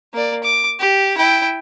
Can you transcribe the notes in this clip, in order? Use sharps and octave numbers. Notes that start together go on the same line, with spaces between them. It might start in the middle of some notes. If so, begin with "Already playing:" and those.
A#3 D5
D6
G4
E4 G5